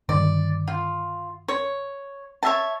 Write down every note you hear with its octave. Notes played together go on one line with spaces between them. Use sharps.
G2 D3 D#3 D5
F4
C#5
C#5 E5 A5